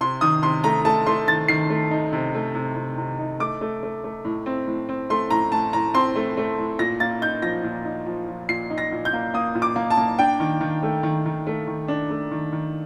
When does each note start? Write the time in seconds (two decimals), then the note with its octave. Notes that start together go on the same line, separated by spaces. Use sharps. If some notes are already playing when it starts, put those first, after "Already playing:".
0.01 C3 C6
0.21 D#3 D#6
0.42 C3 C6
0.64 A3 A#5
0.85 A3 A5
1.06 A3 C6
1.28 D#3 A6
1.48 D#3 C7
1.70 A3
1.91 D#4
2.13 C3
2.34 A3
2.55 C3
2.76 C3
2.98 C3
3.19 D#4
3.40 A3 D6
3.61 A3
3.83 A3
4.04 A3
4.25 A2
4.46 C4
4.67 A2
4.89 C4
5.10 A3 C6
5.30 A2 A#5
5.52 A2 A5
5.73 A2 A#5
5.94 C4 C6
6.16 A3
6.37 A3
6.58 A2
6.79 A#2 A#6
7.00 A#3 A6
7.22 D#4 G6
7.42 F3 A#6
7.64 A#2
7.85 D#4
8.06 F3
8.28 F3
8.49 A#2 C7
8.70 D#4
8.78 A#6
8.92 A#2
9.05 G6
9.13 A#3
9.34 A#3 D#6
9.55 A#2
9.62 D6
9.76 A#3
9.90 A5
9.97 A#3
10.19 D4 G5
10.40 D#3
10.61 D#3
10.83 A3
11.03 D#3
11.26 D#3
11.47 A3
11.68 D#3
11.88 D4
12.10 A3
12.31 D#3
12.53 D#3